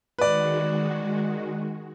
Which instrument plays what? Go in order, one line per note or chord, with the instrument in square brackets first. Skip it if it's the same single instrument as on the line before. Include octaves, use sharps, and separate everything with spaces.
[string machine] D#3 G#3 F#4 [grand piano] B4 D5